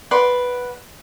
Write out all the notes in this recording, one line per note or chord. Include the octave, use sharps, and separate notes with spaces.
B4 D5 F#5 C6